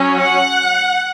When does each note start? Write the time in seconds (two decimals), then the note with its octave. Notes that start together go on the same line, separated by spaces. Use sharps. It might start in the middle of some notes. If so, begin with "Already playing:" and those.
Already playing: F#3 C#4
0.19 F#5